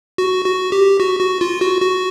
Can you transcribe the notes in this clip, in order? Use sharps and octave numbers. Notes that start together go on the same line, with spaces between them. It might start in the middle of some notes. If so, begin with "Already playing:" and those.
F#4
F#4
G4
F#4
F#4
F4
F#4
F#4